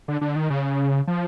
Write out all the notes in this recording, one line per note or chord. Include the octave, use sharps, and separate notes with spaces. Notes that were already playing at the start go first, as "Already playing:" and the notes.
D3
D3
D#3
C#3
F3